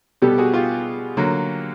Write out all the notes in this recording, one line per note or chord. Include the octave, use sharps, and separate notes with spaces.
B2 G3 B3 G4 A4
F#4 G#4
F4 G4
D3 F#3 A#3